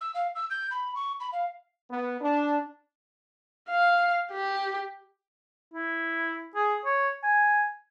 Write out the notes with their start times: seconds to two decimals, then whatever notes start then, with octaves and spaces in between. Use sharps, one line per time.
0.01 E6
0.15 F5
0.35 E6
0.50 G6
0.71 B5
0.95 C#6
1.20 B5
1.33 F5
1.90 B3
2.21 D4
3.69 F5
4.32 G4
5.74 E4
6.55 G#4
6.85 C#5
7.23 G#5